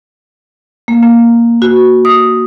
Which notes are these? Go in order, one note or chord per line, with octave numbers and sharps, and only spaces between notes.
A#3
A#3
F#4
D#6